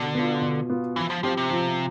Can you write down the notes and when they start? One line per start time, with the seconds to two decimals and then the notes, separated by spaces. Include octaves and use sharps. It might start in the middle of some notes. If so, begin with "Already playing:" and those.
Already playing: B2 D3
0.15 B3 F4
0.41 B2
0.70 B3 F4
0.96 E3 F3
1.10 F3
1.23 F3 C4 G4 C5
1.37 C3
1.51 F3